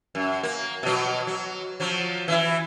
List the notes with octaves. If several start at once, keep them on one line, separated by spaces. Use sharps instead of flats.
F#2
A#3
B2 F#3
F#3
F3 F#3
E3 E4